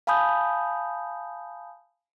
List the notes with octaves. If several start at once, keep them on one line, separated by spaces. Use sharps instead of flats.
F5 G#5 A5 B5 D#6 G6